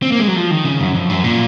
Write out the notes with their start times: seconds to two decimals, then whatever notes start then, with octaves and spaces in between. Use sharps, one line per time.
0.03 C4
0.12 A#3
0.19 G#3
0.28 F#3
0.36 F3
0.51 D#3
0.65 C#3
0.80 F#2
0.94 F2
1.10 F#2
1.24 A#2